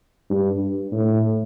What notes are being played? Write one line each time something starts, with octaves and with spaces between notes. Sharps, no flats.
G2
A2